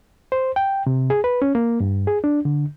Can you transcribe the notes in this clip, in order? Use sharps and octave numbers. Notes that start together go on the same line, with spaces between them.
C5
G5
C3
G#4
B4
C#4
A#3
G2
G#4
D4
D3